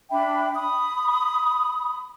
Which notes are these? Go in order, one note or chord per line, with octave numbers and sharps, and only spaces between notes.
D4 E5 G5 B5
B5 D#6